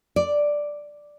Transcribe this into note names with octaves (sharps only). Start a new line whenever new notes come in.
D5